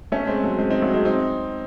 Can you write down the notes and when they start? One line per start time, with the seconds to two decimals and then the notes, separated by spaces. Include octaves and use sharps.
0.12 A3 C#4
0.27 G#3 C4
0.44 F#3 A3
0.59 G#3 C4
0.70 C4 D#4
0.82 F#3 A3
0.94 G#3 C4
1.05 C4 D#4